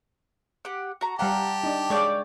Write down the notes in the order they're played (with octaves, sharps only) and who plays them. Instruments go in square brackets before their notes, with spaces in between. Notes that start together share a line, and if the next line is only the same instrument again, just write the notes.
[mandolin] G4 F#5
F#4 A#5
[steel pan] G3 F5 F#5 [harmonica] G4 A5 [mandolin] A#5
[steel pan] D4 D#4
[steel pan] G#3 F5 [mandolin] C#5 D5 G5